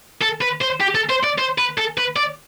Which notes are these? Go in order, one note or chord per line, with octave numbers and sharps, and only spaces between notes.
A4
B4
C5
G4
A4
C5
D5
C5
B4
A4
B4
D5